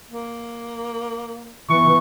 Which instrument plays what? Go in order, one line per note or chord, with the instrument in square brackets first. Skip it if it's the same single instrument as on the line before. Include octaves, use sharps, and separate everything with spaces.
[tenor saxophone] A#3
[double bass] E3 B3 [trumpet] C#6